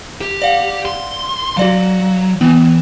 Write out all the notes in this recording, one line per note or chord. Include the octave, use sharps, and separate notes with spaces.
G4
D5 F5 F#5
C6
F#3 F#4 D5 F5
E3 B3